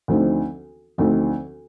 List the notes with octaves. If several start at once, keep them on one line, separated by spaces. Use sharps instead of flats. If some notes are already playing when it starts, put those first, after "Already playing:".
D2 D3 F3 C4 D#4
D2 D3 F3 C4 D#4